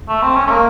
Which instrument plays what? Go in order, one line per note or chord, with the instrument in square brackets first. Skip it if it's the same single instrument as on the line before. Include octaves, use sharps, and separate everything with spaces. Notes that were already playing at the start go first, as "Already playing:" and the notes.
[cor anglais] A3
C4
C#4
A3
A#3